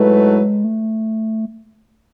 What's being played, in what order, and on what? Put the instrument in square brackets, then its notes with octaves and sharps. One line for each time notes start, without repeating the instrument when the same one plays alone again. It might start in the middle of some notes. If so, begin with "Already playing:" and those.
Already playing: [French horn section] G#2 F#3 A3 E4 B4 [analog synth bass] G#3
[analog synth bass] A3